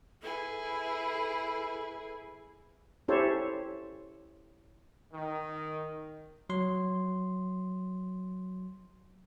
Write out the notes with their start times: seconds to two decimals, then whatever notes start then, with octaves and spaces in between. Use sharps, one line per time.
0.23 E4 G#4 A4 B4
3.08 C#4 E4 G4 A4 C5 C#5
5.13 D#3
6.50 F#3 C6